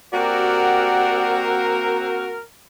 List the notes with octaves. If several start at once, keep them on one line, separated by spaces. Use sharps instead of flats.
A#3 C4 F#4 G4 A#4 D5 F#5